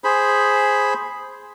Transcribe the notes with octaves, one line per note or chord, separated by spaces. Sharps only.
G#4 C5 B5